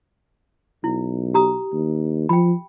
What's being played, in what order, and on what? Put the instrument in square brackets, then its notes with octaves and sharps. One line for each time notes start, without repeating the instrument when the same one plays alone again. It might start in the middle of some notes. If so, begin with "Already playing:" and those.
[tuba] B1 [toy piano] E4
[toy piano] G4 A#5 D#6
[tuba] D#2
[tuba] F3 [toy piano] G5 B5